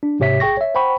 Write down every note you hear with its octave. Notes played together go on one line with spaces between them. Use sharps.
D4
G#2 C3 G4 C#5 E5 B6
A1 G#4 G5 C#6 A#6
C#5 E5
C5 F#5 G5 B5 C#6